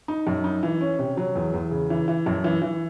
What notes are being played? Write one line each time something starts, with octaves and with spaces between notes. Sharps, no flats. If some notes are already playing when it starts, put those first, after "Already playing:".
D#4
F#2
D#4
E3
C#4
C3
F#3
E2
E2
C#3
E3
E3
F#2
E3
E3